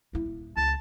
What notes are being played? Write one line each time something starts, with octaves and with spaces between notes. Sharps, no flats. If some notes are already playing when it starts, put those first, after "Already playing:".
D#1 E4
C#2 A5